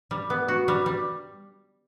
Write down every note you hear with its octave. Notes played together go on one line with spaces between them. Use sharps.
G3
B3
F#4
G3
G3